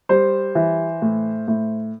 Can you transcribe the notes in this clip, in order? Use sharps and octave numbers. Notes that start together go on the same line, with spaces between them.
G3 C5
E3
A2
A2